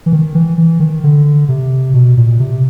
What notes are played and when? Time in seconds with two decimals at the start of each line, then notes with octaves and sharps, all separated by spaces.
0.06 E3
0.13 D#3
0.35 E3
0.58 E3
0.80 D#3
1.04 D3
1.49 C3
1.94 B2
2.17 A#2
2.40 C3